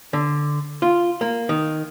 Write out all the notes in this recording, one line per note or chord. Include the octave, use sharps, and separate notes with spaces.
D3
F4
A#3
D#3